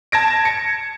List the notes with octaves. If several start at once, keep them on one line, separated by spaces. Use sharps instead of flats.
A5 G#6 A#6 D7
C#7